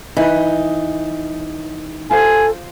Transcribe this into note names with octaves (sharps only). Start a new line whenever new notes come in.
E3 D#4 B4
F4 A4 C5 G#5